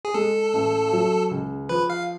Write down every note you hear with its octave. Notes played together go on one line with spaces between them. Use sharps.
G#4
G#3 A4
A1
F#3
C#2
F3 B4
F5